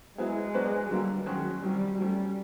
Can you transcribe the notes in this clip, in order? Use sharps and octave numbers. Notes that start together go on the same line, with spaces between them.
F#3 G#3 B3 E4 G#4
F#3 B3 D4 F#4 B4
D3 F#3 G3 A#3
D#3 F#3 G#3 C#4 F#4
C3 D#3 F#3 G3
F#3 G3 A3 C#4